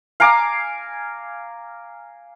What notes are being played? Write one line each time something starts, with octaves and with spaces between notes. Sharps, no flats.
F5 G#5 A#5 D6